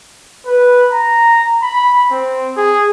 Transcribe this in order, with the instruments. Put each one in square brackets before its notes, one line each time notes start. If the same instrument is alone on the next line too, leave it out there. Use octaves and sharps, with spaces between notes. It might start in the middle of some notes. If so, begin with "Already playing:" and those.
[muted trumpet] B4
A#5
B5
C4
G#4